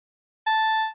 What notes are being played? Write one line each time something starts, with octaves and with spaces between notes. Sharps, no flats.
A5